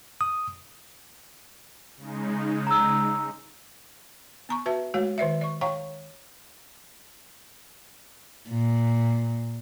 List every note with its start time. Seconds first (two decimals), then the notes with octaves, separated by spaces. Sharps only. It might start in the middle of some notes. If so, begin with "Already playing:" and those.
0.21 D#6
1.97 C#3 G#3 D#4
2.67 A#5 E6
4.49 B3 A#5 C#6
4.66 F#4 B4 E5 A5
4.94 G#3 A3 F#4 C#5 F5
5.18 D#3 B4 D5 E5
5.41 D5 C#6
5.61 C#5 F5 G5 A#5 C#6
8.50 A#2